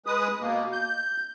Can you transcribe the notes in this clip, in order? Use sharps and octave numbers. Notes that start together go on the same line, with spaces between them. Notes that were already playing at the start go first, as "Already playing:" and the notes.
G#3 B4 D#6
B2 A#3
G6